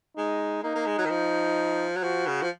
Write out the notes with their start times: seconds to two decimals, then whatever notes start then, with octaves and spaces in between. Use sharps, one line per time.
0.17 G#3 D#4
0.63 A#3 D#4
0.75 A#3
0.86 G#3
0.98 F#3
1.05 D#3
1.10 F3
1.96 F#3
2.03 F3 F#4
2.27 C#3
2.42 F3